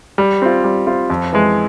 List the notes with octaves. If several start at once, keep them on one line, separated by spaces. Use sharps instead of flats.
G3
C4 F4
G3
C4 F4
F2
E3 G#3